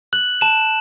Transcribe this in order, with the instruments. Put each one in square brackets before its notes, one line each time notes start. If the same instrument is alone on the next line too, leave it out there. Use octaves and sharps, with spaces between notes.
[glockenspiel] F#6 F#7
A5 E7